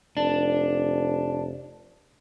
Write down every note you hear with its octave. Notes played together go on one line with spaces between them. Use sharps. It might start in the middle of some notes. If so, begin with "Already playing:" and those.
F1 D4